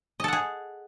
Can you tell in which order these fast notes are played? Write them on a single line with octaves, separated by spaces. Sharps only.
D#5 A4 F#5 G#4